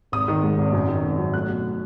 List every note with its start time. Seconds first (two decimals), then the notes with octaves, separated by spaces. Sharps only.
0.12 G#1 D#6
0.28 D#3
0.43 G#2
0.58 G#1
0.73 F#2
0.88 D#3
1.04 G#1
1.19 F#3
1.33 A3 F#6
1.49 B2